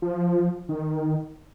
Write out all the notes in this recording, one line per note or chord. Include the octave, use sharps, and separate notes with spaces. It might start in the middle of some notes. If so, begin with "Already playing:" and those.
F3
D#3